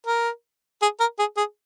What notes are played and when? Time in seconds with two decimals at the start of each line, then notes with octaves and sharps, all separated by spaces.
0.06 A#4
0.82 G#4
1.00 A#4
1.19 G#4
1.37 G#4